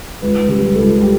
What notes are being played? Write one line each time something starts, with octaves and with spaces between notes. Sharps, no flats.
C#2 B4
C#3 G3 B4
C#2 A4
G3 G4